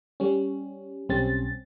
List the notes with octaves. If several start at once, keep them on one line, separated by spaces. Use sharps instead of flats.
G3 C#4
B1 G3 C4 C#4 A6